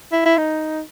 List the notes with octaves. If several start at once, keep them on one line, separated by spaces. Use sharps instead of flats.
E4
E4
D#4